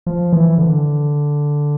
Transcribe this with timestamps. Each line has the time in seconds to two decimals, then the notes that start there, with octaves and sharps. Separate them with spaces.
0.06 F3
0.33 E3
0.58 D3